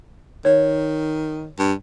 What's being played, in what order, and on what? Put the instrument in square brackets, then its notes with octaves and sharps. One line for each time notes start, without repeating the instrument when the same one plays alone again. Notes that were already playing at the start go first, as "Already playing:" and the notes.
[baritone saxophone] D#3 [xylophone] C#5
[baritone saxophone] G2